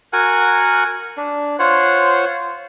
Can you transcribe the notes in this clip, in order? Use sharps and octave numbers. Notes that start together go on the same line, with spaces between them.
F#4 A#4 F#5 G#5
D4
F4 C5 C#5 F#5